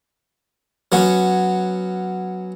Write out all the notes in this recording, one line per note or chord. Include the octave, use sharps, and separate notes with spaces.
F#3 B3 C#4 F#4